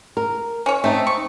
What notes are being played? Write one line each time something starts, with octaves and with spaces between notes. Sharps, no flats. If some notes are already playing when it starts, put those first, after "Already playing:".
A#4
C#4 C#5
A3 C4 D#4
C#6